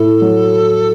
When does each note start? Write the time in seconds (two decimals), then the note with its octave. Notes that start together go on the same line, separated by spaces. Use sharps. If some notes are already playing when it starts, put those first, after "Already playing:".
Already playing: A2 E4 A4
0.22 F#3